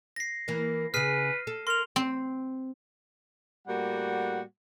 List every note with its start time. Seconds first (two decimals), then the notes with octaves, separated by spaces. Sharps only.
0.16 A#6 C7
0.48 E3 A#3 A#4
0.94 C#3 G#4 B4 F6 C7 D#7
1.47 A4
1.67 A#4 C6 F7
1.96 C4
3.67 A2 G3 A#3 F#4 F#5